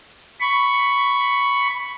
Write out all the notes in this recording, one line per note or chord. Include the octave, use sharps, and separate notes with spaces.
B5 C#6